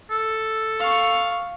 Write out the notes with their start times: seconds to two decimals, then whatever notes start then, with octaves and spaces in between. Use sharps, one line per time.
0.11 A4
0.80 F5 C#6